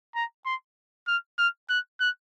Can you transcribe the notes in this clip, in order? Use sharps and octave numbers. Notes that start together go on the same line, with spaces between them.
A#5
C6
F6
F6
F#6
F#6